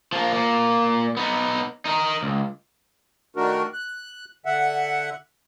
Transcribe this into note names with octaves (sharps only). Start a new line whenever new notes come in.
F3 A#3
A#2 A#3
B3 D#4
D#4 A#4
C#2
D#3 A3 D4 F#4 A#4
F#6
D3 E5 F#5